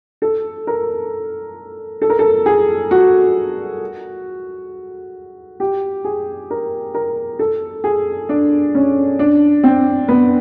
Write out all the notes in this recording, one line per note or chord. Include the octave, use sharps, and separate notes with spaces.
A4
A#4
A4
A#4
A4
G#4
F#4
G4
G#4
A#4
A#4
A4
G#4
D4
C#4
D4
C4
B3